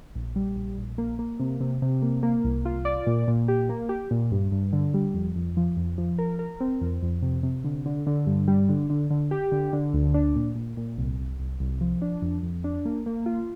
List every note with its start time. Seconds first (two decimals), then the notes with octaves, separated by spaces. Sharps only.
0.15 A#1
0.36 G3
0.56 A#1
0.78 A#1
0.98 A#3
1.19 A#3
1.40 C3
1.60 C3
1.82 C3
2.02 A#3
2.23 A#3
2.44 C2
2.65 F4
2.85 D5
3.07 A#2
3.28 A#2
3.48 G4
3.69 A#3
3.89 G4
4.11 A#2
4.32 G2
4.52 G2
4.73 D3
4.94 G3
5.14 F2
5.35 F2
5.57 F3
5.77 F2
5.98 F3
6.18 A#4
6.39 A#4
6.60 C4
6.81 F2
7.02 F2
7.22 C3
7.43 C3
7.64 D3
7.86 D3
8.07 D3
8.27 G2
8.48 G3
8.69 D3
8.90 D3
9.10 D3
9.31 G4
9.52 D3
9.73 D3
9.93 D2
10.14 D4
10.36 A#2
10.55 A#2
10.77 A#2
10.98 C2
11.19 C2
11.40 C2
11.60 C2
11.81 F3
12.02 D4
12.22 F2
12.43 F2
12.64 D4
12.85 A#3
13.06 A#3
13.26 F4